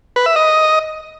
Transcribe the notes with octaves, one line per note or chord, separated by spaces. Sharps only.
B4
E5
D#5